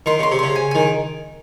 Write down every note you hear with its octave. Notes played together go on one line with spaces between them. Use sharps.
D#3 C6
C#3 C6
C3
C#3 C6
G#5
D#3 G#5